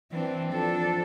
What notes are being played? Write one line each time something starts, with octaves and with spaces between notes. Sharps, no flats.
E3 C4 D4
F3 D4 A4